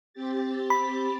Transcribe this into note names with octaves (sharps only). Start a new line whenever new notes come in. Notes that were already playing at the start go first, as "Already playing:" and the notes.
C4 G4 A6
B5